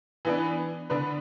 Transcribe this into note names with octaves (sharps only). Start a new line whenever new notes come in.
E3 B3 D4
D3 B3 D4 B4